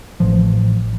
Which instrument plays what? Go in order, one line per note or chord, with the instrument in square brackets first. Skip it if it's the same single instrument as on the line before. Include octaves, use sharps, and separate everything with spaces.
[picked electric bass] A1 F3